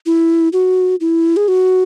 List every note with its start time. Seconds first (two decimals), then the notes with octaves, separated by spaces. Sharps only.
0.06 E4
0.53 F#4
1.01 E4
1.37 G#4
1.48 F#4